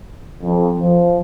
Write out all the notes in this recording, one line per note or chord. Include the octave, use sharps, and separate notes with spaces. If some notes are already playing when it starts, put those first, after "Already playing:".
F2
F3